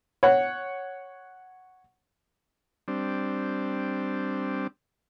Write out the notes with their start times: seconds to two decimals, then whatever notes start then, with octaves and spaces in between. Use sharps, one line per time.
0.23 C#5 F#5
2.88 G3 C4 D4